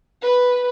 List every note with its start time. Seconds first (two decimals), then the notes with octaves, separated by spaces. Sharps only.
0.24 B4